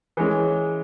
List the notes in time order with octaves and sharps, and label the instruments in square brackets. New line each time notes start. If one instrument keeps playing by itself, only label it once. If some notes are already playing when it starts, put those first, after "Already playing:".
[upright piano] E3 G#3 C#4